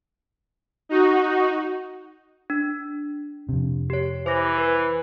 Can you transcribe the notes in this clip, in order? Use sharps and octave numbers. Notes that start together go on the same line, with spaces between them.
D#4 F#4
D4
F2 C3
G4 C#5
E3 C5 D6 A#6
B4